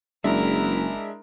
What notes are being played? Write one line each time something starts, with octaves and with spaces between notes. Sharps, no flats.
F#1 G#3 D4 E4 A#4 E5